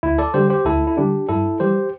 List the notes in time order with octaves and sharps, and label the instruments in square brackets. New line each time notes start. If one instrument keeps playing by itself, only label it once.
[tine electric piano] D2 E4
A4 D5
D3 G3 G4 C5
G4 C5
D2 E4 A4
E4
D3 G3 D4 G4
G2 E4 A4
E3 G3 G4 C5